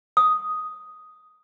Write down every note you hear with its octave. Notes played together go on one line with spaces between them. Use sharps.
D#6